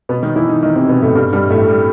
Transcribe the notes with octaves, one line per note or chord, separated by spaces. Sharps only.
B2 B3
D#3 D#4
E3 E4
D#3 D#4
D#3 D#4
C3 C4
B2 B3
A2 A3
G2 G3
G2 G3
A2 A3
G3